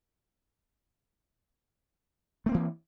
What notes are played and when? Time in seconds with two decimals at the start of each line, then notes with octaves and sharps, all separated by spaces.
2.46 A3
2.49 C4
2.52 A#3
2.54 E3